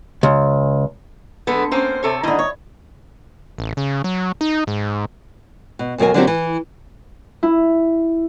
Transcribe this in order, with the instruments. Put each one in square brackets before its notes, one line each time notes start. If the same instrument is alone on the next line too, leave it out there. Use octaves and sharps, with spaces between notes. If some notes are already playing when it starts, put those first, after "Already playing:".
[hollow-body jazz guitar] C#2
[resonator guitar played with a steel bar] D3 G#3 A4 [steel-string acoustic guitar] B3
[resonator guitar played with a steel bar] A#3 C4 C#4 [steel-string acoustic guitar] C5
[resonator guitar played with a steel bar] C3 A4 C#5
[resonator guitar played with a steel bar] G#2 D#3 D#5 [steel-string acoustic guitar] D3 E4
[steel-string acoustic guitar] C#5
[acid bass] A1
C#3
F#3
D#4
G#2
[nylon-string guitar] B2
D2 B2 F#3 A#4 G#5
D3 F3 F#3 A#3 C4 G4
E3
[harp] E4